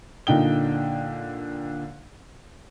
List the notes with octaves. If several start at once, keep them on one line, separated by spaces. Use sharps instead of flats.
A#2 D3 D#4 G5 G7